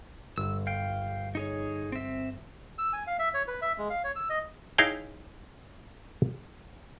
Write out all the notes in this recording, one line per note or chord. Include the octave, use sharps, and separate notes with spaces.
G1 E6
F5 G5
D#4 G#4 C#5
C4 E5
E6
G#5
F5
E5
C#5
B4
E5
G#3
F5
C#5
E6
D#5
D#4 E4 G#4 C#5 F5 G5